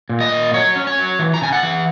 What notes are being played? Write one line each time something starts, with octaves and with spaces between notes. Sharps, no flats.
A#2
D#5
A#2
F#3 C#5
C#4
C#5
F#3
E3
A#5
C#3 G#5
F#5
E3